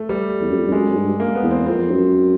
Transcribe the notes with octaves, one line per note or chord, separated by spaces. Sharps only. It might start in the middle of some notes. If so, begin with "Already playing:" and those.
Already playing: A3
G3
E2
F#2
F2
G2
F#2 G#3
F#2
G2
A#3
B3
E2
C4
F2 C4
F#2